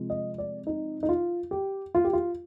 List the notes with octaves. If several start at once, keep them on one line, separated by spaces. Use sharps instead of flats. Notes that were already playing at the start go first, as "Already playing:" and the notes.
Already playing: C3 F3 G#3
D#5
D5
D#4
D#4
F4
G4
F4
G4
F4